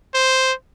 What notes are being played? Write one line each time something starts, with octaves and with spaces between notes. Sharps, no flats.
C5